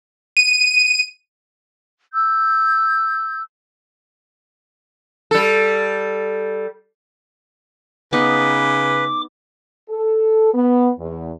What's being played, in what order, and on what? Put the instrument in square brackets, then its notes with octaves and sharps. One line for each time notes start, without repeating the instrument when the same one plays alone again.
[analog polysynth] D#7
[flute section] E6 G6
[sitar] G3 A4
[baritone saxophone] C#3 [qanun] B3 D#4 [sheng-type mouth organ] B4 [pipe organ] D6
[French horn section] A4
B3
E2